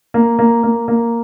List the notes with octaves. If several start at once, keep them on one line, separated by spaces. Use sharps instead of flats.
A#3
A#3
A#3
A#3